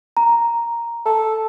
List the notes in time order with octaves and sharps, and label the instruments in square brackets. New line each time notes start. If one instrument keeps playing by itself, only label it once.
[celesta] A#5
[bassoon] A4